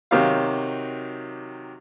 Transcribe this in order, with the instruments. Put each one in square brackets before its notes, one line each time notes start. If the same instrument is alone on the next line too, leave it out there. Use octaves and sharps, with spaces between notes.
[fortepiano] C3 D#3 F#3 G4 F5